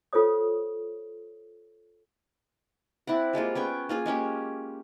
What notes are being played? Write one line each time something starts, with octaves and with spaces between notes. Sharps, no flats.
F4 A4 C5 C#5 D#6
C4 E4 D5 F#5
G3 G#3 A#3 F4
B3 C#4 G5 C#6
A#3 F4 G#4
G#3 A#3 C#4 G4